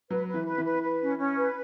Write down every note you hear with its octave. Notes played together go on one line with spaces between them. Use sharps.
F#3 B4
B4
E3
B4
E3
B4
B4
C#4
C#4
B4